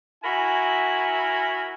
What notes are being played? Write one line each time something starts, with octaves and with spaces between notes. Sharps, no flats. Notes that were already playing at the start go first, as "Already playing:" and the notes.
E4 F#4 A#4 G#5 B5